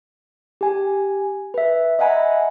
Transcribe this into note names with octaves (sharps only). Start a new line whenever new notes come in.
G4 G#5
B4 E5
D#5 E5 F#5 G#5 A#5 B5